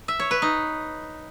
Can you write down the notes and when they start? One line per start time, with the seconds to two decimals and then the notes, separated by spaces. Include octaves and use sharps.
0.08 E5
0.20 C#5
0.31 B4
0.42 D#4